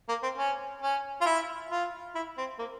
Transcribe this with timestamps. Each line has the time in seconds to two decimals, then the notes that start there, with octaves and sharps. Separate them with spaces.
0.09 A#3
0.23 C4
0.37 C#4
0.82 C#4
1.21 F4
1.26 E4
1.71 F4
2.15 E4
2.37 C4
2.59 A#3